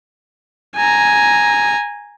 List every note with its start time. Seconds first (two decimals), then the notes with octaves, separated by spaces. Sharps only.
0.76 G#5 A#5